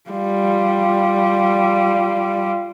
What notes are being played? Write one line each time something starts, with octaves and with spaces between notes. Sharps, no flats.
G3 F4